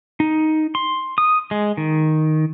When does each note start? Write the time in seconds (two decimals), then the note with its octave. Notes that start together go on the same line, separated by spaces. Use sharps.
0.20 D#4
0.75 C6
1.18 D#6
1.51 G#3
1.77 D#3